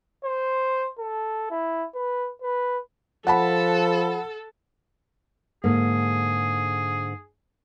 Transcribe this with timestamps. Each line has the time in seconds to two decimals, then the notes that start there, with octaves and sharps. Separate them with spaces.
0.24 C5
0.99 A4
1.51 E4
1.95 B4
2.42 B4
3.27 F3 A4 F#5 A5 B5
5.64 G#2 D3 A#3 G#4